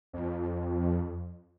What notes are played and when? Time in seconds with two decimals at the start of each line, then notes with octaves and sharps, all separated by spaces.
0.13 F2